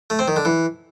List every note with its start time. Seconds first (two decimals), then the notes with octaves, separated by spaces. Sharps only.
0.10 A3
0.19 C4
0.28 D#3
0.36 D3
0.45 E3